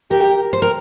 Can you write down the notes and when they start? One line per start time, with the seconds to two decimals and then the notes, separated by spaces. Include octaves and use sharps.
0.11 G4 A#4
0.53 C5
0.62 A#4